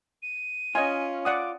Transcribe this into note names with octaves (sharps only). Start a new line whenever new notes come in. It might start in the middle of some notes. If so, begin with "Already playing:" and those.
D#7
C#4 F4 D#5 G#5
D5 F#5 D6 D#6